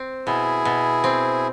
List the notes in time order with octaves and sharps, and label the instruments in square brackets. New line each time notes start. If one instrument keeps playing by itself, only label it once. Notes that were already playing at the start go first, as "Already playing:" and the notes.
Already playing: [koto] C4
[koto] B2 [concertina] E4 G#4
[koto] B2
C4